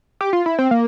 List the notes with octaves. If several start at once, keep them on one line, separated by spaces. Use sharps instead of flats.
G4
F4
E4
C4
A#3